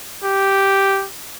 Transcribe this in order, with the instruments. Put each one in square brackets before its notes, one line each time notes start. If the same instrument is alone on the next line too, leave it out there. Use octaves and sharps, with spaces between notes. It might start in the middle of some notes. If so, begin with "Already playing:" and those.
[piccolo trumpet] G4